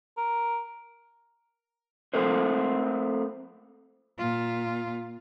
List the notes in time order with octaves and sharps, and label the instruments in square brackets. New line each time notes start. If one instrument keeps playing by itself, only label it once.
[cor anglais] A#4
[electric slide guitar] A3 C4 A4 A#4 C5
[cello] A#2 F4